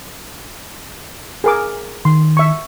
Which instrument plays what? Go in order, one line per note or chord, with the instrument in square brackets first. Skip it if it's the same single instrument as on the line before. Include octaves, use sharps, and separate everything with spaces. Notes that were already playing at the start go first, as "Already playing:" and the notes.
[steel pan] G#4 A#4 D6
[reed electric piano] D#3 [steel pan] C6
[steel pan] E5 C#6